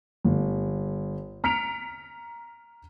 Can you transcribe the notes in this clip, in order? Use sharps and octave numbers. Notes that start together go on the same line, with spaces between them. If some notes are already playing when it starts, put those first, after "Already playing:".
G1
A#5 F6 B6 C#7 D7 F7